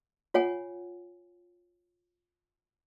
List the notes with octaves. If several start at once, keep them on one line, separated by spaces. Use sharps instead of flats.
F4 C#5 F#5 G#5